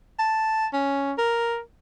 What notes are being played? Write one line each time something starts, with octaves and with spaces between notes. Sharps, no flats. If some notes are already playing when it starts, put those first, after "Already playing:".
A5
C#4
A#4